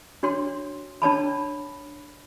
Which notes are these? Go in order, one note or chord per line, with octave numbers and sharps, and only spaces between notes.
D4 F#4 C#5 C6
D4 C#5 A5 B5